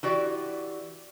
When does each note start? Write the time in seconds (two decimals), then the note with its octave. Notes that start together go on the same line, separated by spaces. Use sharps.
0.03 E3 F#4 G4 D5